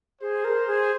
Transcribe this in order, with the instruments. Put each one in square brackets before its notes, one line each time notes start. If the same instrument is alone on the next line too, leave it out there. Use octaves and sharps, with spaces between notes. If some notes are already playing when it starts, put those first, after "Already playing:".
[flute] G#4 [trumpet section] C5
[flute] A#4
G#4